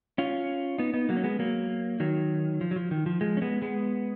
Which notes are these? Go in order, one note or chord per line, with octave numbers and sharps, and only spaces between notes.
C#4 F4
B3 D#4
B3 D#4
F#3 A#3
C#4
G#3 B3
F#3 A#3
D#3 F#3
F3
F#3
F3
D#3
F3
F3 G#3
C#4
G#3 B3
G#3 B3